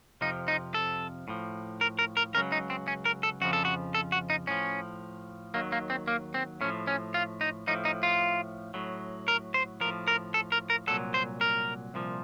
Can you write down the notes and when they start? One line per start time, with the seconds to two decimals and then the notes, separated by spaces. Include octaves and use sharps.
0.21 F2 C3 F3 D#4
0.48 D#4
0.74 A4
1.28 A2 F3
1.81 A#4
1.99 A#4
2.17 A#4
2.34 C#2 C#3 F#3 A#4
2.52 D#4
2.70 C4
2.88 C#4
3.05 A#4
3.23 A4
3.41 F2 C#3 F3 F#4
3.53 A4
3.65 F#4
3.95 A4
4.12 F#4
4.30 D#4
4.47 A2 F3 C#4
5.54 D#2 D#3 F#3 A#3
5.72 A#3
5.90 C4
6.08 A#3
6.34 C4
6.61 A2 C#4
6.64 F3
6.87 C#4
7.14 F4
7.41 D#4
7.67 A2 F3 D#4
7.85 D#4
8.03 F4
8.74 A2 F#3
9.28 A#4
9.54 C5
9.81 F3 A#4
9.85 A2
10.08 A#4
10.34 A4
10.52 A#4
10.70 A#4
10.87 C2 A#2 F#3 A4
11.14 C5
11.41 A#4
11.94 C2 A#2 F3